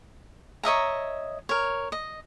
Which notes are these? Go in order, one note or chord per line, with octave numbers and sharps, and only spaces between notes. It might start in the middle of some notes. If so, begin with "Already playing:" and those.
C#5 D#5 E5 A#5
A#4 C#5
D#5